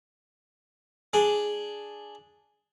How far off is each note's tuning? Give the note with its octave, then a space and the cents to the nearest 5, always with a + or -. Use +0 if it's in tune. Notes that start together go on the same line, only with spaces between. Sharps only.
D4 +0 G#4 +0